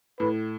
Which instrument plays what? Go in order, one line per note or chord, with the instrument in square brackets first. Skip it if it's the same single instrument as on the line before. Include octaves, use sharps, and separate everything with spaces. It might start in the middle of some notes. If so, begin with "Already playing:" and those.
[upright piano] A2 [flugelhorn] B4